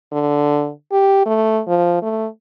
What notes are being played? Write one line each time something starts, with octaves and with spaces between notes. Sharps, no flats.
D3
G4
A3
F3
A3